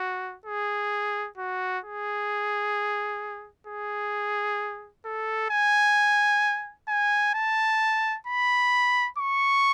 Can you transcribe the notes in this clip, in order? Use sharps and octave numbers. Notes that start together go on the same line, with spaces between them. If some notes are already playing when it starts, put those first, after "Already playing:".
Already playing: F#4
G#4
F#4
G#4
G#4
A4
G#5
G#5
A5
B5
C#6